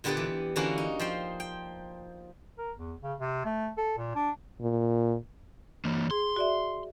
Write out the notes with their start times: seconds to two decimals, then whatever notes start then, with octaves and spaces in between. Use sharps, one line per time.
0.04 A#2 D3 B3 G4 B4 D5
0.17 E3
0.56 D3 E3 A#3 C#4 E4 F#4
0.78 D#4
0.99 F3 C5 G5
1.40 G5
2.58 A#4
2.77 E2
3.03 C#3
3.20 C3
3.45 A3
3.78 A4
3.98 A#2
4.15 D4
4.61 A#2
5.85 E3 A#3
6.11 G#4 C6
6.36 F#4 D5 E5